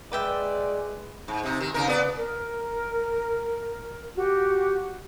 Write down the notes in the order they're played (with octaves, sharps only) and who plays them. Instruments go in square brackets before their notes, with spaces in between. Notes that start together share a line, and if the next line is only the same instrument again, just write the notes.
[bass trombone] G#3 [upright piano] B4 [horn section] D5 [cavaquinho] E5 G5 D6
[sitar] G#2
C3 D#4
D#3
C#3 D#4 A#4
B3 D5
[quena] A#4
[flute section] F#4 G4